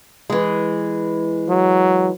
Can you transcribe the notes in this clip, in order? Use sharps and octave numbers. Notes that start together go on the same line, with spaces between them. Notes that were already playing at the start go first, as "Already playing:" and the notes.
E3 G#3
F#3